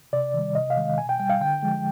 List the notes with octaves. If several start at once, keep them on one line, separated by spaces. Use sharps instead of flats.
C3 D5
D#3 G3
C3 D#5
F5
D#3 G#3
B2 G#5
G5
G3 G5
F5
D3 G5
F3 G#3